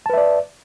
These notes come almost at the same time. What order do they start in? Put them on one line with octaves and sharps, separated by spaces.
A5 B4 E5 D5